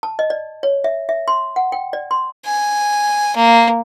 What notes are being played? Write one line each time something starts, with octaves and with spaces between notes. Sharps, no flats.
A5
D#5
D5
C#5
E5
E5
C6
F#5
G5
D5
C6
G#5
A#3